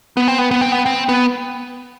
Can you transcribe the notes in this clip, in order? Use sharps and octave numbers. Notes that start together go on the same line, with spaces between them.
B3
C4
B3
B3
C4
B3
C4
B3